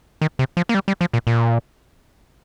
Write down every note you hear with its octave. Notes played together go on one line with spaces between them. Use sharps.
D#3
C3
F3
A#3
G3
G3
F3
A#2
A#2